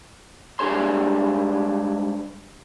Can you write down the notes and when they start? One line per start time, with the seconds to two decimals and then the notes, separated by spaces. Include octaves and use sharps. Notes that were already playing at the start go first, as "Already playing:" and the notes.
0.59 G#2 G3 D4 G#4 C#5 C6